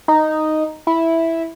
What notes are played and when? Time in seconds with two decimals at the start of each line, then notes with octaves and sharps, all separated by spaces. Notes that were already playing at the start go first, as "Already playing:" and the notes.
0.08 D#4
0.87 E4